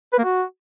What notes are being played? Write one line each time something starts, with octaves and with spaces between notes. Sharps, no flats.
B4
A#3
F#4